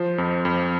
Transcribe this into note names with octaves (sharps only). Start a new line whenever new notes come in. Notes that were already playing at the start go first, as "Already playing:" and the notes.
Already playing: F3 C5
F2
F2